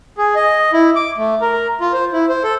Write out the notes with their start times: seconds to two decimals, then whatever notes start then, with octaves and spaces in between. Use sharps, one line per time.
0.18 G#4
0.35 D#5
0.73 E4
0.96 D6
1.18 A3
1.41 A#4
1.81 F4
1.93 C5
2.13 E4
2.29 C5
2.44 A4